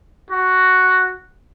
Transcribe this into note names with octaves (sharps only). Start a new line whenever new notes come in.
F#4